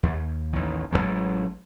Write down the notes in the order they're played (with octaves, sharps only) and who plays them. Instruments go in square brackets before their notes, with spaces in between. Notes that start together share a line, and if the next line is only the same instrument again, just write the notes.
[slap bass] D#2
A1 D#2 D#3
A1 D#3 F#3 G#3